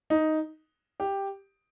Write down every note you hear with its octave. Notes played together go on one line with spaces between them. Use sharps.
D#4
G4